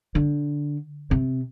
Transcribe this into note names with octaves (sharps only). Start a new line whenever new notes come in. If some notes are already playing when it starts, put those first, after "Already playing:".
D3
C3